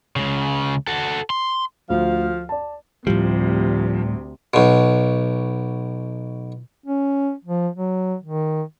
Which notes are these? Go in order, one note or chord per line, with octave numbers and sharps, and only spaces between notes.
C#2 C#3
F#4 A4
C6
D2 F3 F5
D5 A5
D2 A2 C3 F3 G3
B1 B2
C#4
F3
F#3
D#3